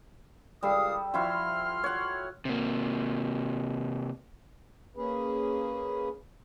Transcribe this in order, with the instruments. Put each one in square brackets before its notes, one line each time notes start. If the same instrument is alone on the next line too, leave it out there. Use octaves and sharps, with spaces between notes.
[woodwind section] C#2 F5 D#6 [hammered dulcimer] G3 A4
[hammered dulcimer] F3 E4 F#4 [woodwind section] C6 F6
[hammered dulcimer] C#5 F#5
[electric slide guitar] C3 A#3
[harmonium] A#3 C#4 G#4 B4